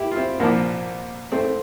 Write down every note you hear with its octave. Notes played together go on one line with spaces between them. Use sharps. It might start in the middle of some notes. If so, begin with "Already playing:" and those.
Already playing: E4 G4
F4
C4 E4
C2 A#2 F3 A#3 D4
A3 C4